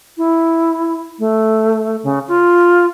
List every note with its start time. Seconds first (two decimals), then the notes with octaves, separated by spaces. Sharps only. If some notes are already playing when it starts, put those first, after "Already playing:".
0.18 E4
1.19 A3
2.03 C#3
2.28 F4